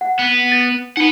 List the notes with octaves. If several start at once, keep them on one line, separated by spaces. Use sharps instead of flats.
F#5
B3
A6
D#4 F#5 B5 G7